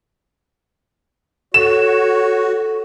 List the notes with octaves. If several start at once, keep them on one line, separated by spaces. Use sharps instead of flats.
F#4 A4 C#5 E7